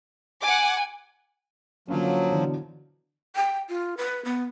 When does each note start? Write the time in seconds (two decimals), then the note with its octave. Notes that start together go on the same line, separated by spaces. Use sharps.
0.43 F#5 G#5 D6
1.88 D3 F3 F#3 A#3 C#4
2.31 B2 D3 E3
3.36 G5
3.69 F4
3.97 B4
4.25 B3